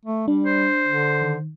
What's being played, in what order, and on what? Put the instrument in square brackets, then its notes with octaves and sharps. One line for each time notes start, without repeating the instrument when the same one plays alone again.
[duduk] A3
[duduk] G3 [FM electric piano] D4
[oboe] C5
[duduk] D3
[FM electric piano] D#3